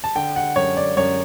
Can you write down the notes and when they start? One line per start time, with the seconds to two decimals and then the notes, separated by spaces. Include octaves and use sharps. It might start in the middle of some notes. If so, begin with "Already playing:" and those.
0.04 A5
0.15 D3 G5
0.36 F#5
0.56 F#2 C#5
0.77 D5
0.97 F#2 C#5